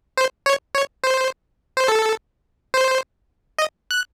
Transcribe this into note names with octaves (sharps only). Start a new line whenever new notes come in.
C5
C#5
C#5
C5
C5
A4
C5
D#5
F#6